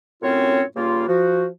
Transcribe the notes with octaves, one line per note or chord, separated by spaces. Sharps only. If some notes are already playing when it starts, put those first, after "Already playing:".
F#2 A2 C4 C#4 F4 C#5
G2 C#3 A#3 F4
F3 F#4